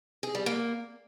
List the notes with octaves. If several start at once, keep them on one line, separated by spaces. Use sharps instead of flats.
G#4
G3
A#3